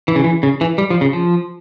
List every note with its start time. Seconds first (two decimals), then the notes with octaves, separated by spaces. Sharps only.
0.08 E3
0.16 C#3
0.24 E3
0.43 C#3
0.61 E3
0.78 G3
0.90 F3
1.01 C#3
1.13 F3